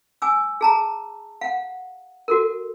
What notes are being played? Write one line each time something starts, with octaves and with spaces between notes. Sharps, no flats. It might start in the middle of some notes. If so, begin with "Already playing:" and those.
G#5 D6 E6
G#4 A5 A#5
F5 F#5
F#4 A4 A#4